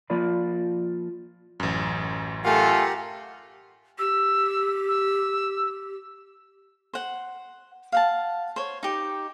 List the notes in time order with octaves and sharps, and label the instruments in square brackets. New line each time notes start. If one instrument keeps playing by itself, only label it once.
[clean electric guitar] F3 A#3 F4 A#4 D5 B5
[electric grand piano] A1 F#2
[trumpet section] A3 F4 A4 [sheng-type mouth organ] G4 A#4 F#5 [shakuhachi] G#5
[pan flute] G4 [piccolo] E6
[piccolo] E6
[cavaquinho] C5 F#5
F5 F#5 A5
C5 C#5
D#4 G4